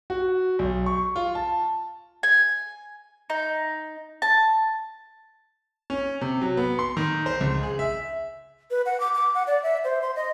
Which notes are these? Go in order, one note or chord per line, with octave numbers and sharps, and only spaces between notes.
F#4
B1
C#6
F4
A5
G#5
D#4
A5
C#4
C3
F#3
B3
C6
D#3
C5
C#2
G#4
E5
B4
F#5
D6
D6
F#5
D5
E5
C5
C6
D#5